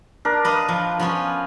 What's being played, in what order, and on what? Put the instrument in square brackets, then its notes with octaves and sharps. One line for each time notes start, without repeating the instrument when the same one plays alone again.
[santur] D4 A#4
[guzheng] B4 D#5 F5
F3
F3 B3 C#4